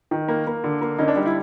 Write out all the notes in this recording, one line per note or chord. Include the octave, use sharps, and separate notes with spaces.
D#3
A#3
A#3
D3
A#3
D3 C#4 D#4
D4
G3 D#4
E4